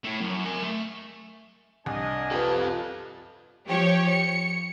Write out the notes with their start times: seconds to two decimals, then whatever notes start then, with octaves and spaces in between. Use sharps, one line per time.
0.04 A3 E4
0.21 F#2
0.45 A#4 G#5
0.63 A3
1.86 C2 D4 D#5 G#5
2.31 F4 G4 A4 B4
3.67 F3 G4 C#5
4.07 C#7